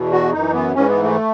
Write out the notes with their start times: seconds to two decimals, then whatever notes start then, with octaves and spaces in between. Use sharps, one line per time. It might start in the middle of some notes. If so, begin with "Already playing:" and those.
Already playing: E2 B2
0.11 F#4
0.33 F#2 E3 D#4
0.54 B3
0.74 G#2 E3 C#4
0.89 B3
1.03 A3